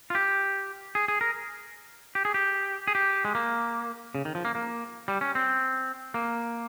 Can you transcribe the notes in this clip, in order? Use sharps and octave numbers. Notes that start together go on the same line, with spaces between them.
F4
G4
G#4
G#4
A#4
G4
G#4
G4
G#4
G4
G#3
A#3
C#3
D#3
F3
A#3
A#3
G3
C#4
C4
A#3